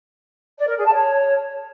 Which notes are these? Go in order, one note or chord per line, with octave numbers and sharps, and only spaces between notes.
D5
A#4
G#4
A5
C#5